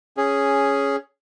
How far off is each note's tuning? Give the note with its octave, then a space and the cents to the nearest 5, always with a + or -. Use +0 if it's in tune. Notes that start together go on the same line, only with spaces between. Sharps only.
C#4 +0 G#4 +0